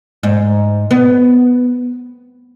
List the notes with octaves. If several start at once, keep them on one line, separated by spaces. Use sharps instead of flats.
G#2
B3